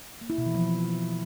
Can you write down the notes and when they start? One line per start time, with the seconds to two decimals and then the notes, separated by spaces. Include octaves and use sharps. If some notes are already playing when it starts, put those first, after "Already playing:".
0.21 A#3
0.30 E4
0.38 B2
0.46 E3
0.55 F3